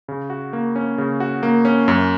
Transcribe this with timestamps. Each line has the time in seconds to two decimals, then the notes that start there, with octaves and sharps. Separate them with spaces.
0.08 C#3
0.30 F#4
0.53 A#3
0.76 C#4
0.98 C#3
1.20 F#4
1.43 A#3
1.65 C#4
1.88 F#2